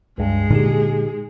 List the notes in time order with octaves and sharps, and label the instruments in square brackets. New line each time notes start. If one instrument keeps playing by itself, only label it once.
[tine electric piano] C#2 G2 [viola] G#3 G#4
[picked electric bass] A#2 D3 [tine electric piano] D#4 G4